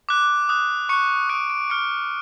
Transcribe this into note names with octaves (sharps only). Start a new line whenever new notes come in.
D6 F#6
D#6 F#6
C#6 F#6 C#7
D#6 F#6 D7
D7
C#6 F6 C#7